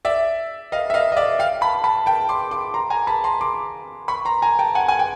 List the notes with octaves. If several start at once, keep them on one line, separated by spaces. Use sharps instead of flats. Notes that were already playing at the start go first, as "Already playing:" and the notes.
D5 E5
D#5 F5
E5
D#5 F5
D#5
D5 E5
F5 G5
A5 B5
A5 B5
G5 A5
C6 D6
C6 D6
A#5 C6
G#5 A#5
A5 B5
A#5 C6
C6 D6
B5 C#6
A#5 C6
G#5 A#5
G5 A5
F#5 G#5
G#5
G5